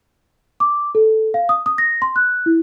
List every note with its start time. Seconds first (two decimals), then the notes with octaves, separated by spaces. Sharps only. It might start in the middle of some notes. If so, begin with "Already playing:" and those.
0.60 D6
0.95 A4
1.34 F5
1.49 D#6
1.66 D#6
1.78 A#6
2.02 C6
2.16 F#6
2.46 E4